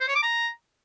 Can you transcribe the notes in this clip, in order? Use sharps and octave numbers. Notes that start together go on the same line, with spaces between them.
C5
C#5
D6
A#5